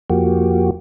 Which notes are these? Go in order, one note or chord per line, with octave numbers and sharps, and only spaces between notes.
F2 F3 A#3 F#4 G4